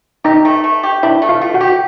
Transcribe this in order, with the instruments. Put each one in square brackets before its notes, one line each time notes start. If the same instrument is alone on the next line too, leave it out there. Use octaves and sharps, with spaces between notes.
[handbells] D#4 D#5 [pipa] G4
[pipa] A3
A3
G4
[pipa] D4 [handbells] E4 E5
[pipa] A3
[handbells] F4 F5
[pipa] A3
[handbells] F#4 F#5
[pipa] G4